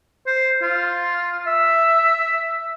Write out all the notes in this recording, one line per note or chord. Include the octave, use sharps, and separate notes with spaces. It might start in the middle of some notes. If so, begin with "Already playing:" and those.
C5
F4
E5